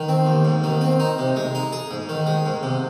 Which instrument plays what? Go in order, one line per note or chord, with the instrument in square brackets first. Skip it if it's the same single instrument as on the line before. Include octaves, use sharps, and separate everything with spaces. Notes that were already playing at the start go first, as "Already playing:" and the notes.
Already playing: [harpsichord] D#3
C4
D#2
G#2
D#3
C4
D#4
C3
G#3
D#4
G#4
G#2
D#3
G#3
G#2
C3